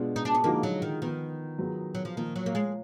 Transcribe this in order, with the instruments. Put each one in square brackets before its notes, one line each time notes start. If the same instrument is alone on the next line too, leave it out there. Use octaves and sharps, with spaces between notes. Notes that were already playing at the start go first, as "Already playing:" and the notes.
Already playing: [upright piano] B2 G#3 D4 F4
[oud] D#4
D4
B3
[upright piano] D3 F3 G#3 D#4 F#4 [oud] A#3
[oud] F#3
D#3
[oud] D#3 [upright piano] F3 B3 D#4
[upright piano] F#3 B3 F4 G#4
[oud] F#3
F3
[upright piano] A#2 F3 A#3 [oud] D#3
[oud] F#3
A#3
G#3